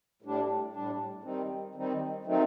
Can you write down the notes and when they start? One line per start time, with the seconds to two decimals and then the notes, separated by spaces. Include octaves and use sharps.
0.22 A2 G3 D4
0.73 A2 G3 D4
1.24 D#3 G3 C4 D#4
1.75 D#3 G3 C4 D#4
2.25 D#3 F#3 A3 C4 D#4